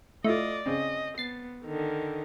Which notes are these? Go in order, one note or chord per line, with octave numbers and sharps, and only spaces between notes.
A3 E4 F4 D5 D#5
C#3 C4 D#5
B3 A6 C7
D3 D#3